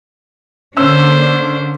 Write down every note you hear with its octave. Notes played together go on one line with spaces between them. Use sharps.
D3 A#3 C#4 D4 C5 E6